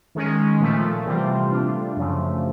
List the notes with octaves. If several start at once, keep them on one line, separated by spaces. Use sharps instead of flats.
D#3 G#3 C#4
A#2 F3 A3
C3 E3 G3 C4 F4
A3 D4 F4
F#2 C#3 F3 A3